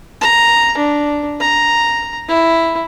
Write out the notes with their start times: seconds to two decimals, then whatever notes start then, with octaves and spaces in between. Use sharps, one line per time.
0.21 A#5
0.77 D4
1.41 A#5
2.28 E4